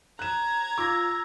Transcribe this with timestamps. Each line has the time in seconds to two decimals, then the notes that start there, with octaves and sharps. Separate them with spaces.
0.19 A#5 F#6 G#6 E7
0.78 F4 D6 E6 A#6